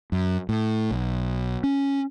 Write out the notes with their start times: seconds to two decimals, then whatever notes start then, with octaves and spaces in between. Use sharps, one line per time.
0.12 F#2
0.49 A2
0.91 B1
1.63 C#4